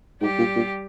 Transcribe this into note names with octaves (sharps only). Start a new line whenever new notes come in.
G#2 G3 G4
A#2
A#2